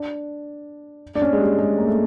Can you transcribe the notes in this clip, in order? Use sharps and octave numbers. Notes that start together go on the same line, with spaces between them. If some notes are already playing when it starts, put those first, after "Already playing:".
Already playing: D4
D4
C#4
G#3
G3
G#3
A#3
A3